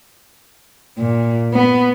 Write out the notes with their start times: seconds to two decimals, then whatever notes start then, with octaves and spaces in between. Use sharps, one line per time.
0.98 A#2
1.53 B3